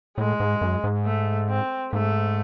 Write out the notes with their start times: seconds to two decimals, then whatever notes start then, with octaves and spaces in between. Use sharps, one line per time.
0.18 A2 G#3
0.40 G#2
0.61 F#2
0.84 G#2
1.05 A3
1.49 C4
1.93 G#2 A3